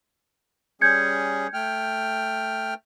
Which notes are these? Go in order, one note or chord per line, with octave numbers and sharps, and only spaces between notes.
G3 C#4 G#4 G6 G#6 C#7
A3 G5 F6